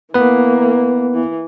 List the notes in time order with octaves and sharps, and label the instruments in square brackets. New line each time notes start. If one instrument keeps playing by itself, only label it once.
[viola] E3 A#3 [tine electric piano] B3 B4
[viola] E3